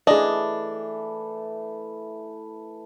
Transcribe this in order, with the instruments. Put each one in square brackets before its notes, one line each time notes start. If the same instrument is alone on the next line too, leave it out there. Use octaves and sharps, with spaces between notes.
[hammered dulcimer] E3 A3 [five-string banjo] D4 [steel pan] G#4 D#5